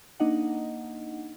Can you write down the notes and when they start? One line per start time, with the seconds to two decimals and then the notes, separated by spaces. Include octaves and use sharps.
0.20 A#3 D4 D#4 D#5 F#5